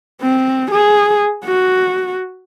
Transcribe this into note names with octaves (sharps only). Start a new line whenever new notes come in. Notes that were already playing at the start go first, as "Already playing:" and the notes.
C4
G#4
F#4